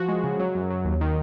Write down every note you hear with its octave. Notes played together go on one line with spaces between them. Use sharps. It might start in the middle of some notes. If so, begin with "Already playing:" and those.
Already playing: F3 F#4
G#3
C#3
F#3
F#2
F#3
D#2
D#3